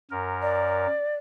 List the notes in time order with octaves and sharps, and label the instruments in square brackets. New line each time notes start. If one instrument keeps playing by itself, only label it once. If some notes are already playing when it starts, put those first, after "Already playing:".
[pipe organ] F#2 A#4
[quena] D5